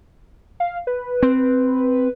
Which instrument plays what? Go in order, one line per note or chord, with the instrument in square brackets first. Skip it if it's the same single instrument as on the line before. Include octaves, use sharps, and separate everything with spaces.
[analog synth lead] F5
B4
[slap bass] C4